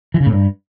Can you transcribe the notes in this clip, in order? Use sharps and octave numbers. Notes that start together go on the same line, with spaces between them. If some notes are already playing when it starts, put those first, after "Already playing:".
E3
C#3
A2
G2